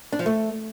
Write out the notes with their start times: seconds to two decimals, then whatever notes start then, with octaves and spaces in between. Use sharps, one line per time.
0.12 D4
0.19 F3
0.26 A3